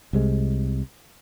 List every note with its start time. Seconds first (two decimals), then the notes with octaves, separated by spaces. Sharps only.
0.13 C2 C3 G#3